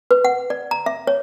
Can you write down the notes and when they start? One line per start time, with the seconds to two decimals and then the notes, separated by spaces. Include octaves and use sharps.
0.11 B4
0.25 F#5
0.50 D5
0.71 A#5
0.86 E5
1.07 C#5